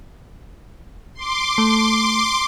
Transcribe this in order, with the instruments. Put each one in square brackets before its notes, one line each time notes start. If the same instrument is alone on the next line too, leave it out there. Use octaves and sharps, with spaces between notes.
[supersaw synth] C6 D6
[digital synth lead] A3